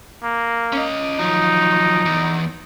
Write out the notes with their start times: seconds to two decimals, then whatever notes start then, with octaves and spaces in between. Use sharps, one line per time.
0.23 A#3
0.73 C#4 D#5
1.19 F3 F#3 D#4
2.06 E2 E3